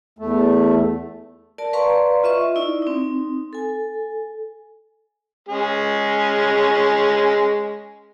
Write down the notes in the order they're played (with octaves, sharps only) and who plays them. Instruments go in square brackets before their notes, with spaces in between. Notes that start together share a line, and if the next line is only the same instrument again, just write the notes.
[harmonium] E2 A3
[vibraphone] A#4 D5 A5
B4 D5 F5 A#5 C6 C#6
F4 D#5 E5 C#6
D#4 E4 D5
C4 D#4
A4 G#5
[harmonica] G#3 C#4 G#4